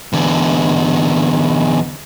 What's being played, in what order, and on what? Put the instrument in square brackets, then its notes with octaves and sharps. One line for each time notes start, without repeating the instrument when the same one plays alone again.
[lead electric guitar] E2 D3